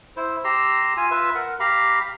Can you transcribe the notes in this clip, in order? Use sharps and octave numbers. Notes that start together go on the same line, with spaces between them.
E4 C5
G4 A#5 C6 E6
F4 G#5
F4 B4 E5
A#4 F#5
G4 F5 A#5 B5